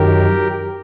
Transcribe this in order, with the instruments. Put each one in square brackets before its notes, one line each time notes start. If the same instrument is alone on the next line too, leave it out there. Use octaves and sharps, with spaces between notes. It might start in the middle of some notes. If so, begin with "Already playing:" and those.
Already playing: [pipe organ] F#2 D#3 F#3 G4 A#4